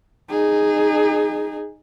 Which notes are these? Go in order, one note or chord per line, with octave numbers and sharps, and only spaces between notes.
D#4 G#4